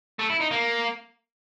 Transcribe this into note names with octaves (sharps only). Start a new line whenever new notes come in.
A3
E4
D#4
A#3